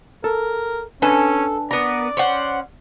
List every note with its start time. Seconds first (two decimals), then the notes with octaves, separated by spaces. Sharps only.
0.24 A4 A#4
1.02 C#4 D4 A4 B4 G#5
1.71 B3 A#4 D5
2.17 C#4 C5 F#5